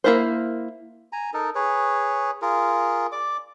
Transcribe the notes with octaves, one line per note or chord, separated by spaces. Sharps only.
A#3 D4 E4 A#4 C5
G#5 A#5
D#4 A4 A#4
G#4 B4 C#5
F4 G#4 A#4
D5 D6